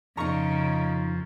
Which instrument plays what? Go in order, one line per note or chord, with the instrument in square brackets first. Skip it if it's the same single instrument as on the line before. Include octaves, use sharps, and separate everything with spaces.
[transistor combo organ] F2 [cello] C#3 [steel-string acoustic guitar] D#4 F4 [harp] A#5 C#6